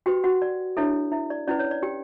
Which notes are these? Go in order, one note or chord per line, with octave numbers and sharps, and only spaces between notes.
F#4 G4 B4 G5
F#4 F#5
D5
D4 E4 A4 C#5 E5
E4 E5
D5
C#4 E4 B4 D5
C#5
D5
G4 G5